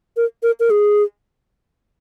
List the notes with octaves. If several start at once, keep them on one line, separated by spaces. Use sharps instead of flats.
A#4
A#4
A#4
G#4